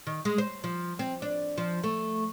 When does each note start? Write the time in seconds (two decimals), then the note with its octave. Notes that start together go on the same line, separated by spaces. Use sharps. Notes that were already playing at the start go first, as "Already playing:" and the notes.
0.07 D#3
0.25 G#3
0.38 C5
0.64 F3
0.99 C4
1.22 D4
1.58 F3
1.84 A3